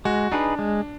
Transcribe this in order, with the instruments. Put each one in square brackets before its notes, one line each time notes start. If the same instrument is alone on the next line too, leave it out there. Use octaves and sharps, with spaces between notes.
[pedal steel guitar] G#3 [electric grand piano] F#4
[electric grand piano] D4 [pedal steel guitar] D#4 G#4 B4
[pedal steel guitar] G#3